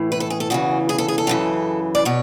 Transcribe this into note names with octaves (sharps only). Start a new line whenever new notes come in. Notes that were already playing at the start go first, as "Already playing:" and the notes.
Already playing: A2 E3
B4
A4
G#4
A4
E2 C#3 E3 F#4
G#4
A4
G#4
A4
F#2 C#3 E3
D5
B2 C#5